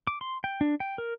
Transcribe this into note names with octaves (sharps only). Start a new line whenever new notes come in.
D6
C6
G5
D4
G5
A#4